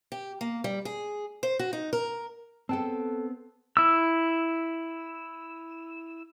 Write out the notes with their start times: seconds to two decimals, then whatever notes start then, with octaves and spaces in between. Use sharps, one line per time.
0.12 G4
0.41 A#3
0.64 G3
0.85 G#4
1.43 C5
1.59 F#4
1.73 D#4
1.93 A#4
2.69 B3 C4 A4 G5 A5
3.77 E4 E6